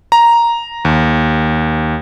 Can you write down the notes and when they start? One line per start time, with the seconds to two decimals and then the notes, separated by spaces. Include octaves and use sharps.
0.12 A#5
0.85 D#2